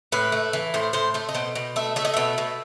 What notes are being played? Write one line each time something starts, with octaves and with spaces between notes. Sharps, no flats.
A2 B4
A3
E3
A2 C5
A2 C5
A3 C5
D#5
B2 C5
B2
A3 E5
A3 E5
D#5
B2 E5
B2